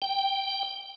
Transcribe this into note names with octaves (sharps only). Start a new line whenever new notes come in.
G5